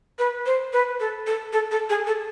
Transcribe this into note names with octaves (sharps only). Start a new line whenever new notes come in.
B4
C5
B4
A4
A4
A4
A4
G#4
A4